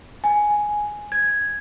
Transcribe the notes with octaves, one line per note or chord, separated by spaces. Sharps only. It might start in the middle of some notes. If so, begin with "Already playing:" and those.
G#5
G#6